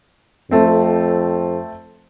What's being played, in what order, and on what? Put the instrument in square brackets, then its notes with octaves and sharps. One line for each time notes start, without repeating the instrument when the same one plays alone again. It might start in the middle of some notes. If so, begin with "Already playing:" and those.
[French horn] F2 [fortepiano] A3 C4